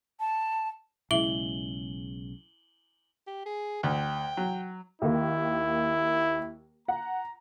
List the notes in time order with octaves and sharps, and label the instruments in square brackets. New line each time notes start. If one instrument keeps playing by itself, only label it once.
[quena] A5
[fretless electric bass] B1 C#3 G#3 [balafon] E4 E5 [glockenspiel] F#7 G7
[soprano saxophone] G4
G#4
[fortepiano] D2 [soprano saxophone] G5
[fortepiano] F#3
[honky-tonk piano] D#2 D#3 A#3 [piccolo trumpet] E4
[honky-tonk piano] F#5 [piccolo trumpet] A#5